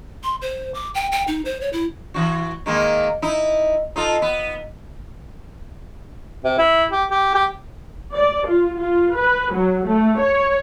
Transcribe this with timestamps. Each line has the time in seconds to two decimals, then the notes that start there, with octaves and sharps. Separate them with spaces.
0.23 C6
0.42 C5
0.74 D6
0.95 G5
1.12 G5
1.28 D#4
1.45 C5
1.61 C#5
1.73 E4
2.14 E3 F#4
2.66 D#3 G#3 A#3
3.22 D#4 E4
3.96 D#4 F4 A4
4.22 B3
6.44 C3
6.58 E4
6.91 G4
7.11 G4
7.35 G4
8.14 D5
8.47 F4
8.76 F4
9.16 B4
9.52 F#3
9.85 A3
10.19 C#5